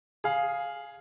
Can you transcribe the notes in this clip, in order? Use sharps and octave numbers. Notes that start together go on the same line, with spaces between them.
G#4 F5